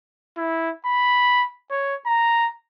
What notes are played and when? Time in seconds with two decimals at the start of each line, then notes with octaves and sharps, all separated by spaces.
0.37 E4
0.86 B5
1.71 C#5
2.06 A#5